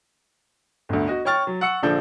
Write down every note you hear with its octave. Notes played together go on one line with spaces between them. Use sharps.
G1 D2
F#4 D#5
C#5 G5 C#6 F6 A6
F#3
F#5 C#6 E6 C#7
A#1 D3 F3 D4 A4 G6